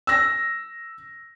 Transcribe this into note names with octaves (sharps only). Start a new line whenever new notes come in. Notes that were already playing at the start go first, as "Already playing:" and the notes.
E6 A#6